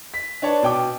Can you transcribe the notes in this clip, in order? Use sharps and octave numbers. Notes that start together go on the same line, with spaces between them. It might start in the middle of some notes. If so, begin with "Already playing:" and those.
B6
D4 B4 C#5 A5
B2 G5 D6